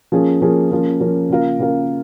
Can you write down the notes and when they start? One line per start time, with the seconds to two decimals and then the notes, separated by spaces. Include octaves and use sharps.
0.12 F3 A#3 C#4 G#4
0.42 F3 A#3 C#4 G#4
0.71 F3 A#3 C#4
1.00 F3 A#3 C#4
1.29 C#3 A#3 F4 A#4
1.59 C#3 A#3 F4 A#4